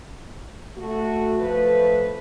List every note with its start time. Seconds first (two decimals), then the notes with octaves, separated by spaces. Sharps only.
0.77 A3 F#4
1.40 F3 A3 B4